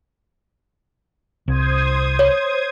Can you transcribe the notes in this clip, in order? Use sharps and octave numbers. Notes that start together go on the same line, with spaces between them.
C2 C5 D#6 G#6
C#5